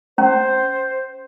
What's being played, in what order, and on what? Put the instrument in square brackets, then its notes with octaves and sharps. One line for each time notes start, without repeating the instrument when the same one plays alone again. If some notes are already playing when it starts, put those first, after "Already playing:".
[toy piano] C#4 [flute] C5